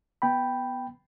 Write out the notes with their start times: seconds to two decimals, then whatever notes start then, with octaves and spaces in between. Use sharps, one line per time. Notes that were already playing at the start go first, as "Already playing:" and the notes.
0.22 B3 G5 B5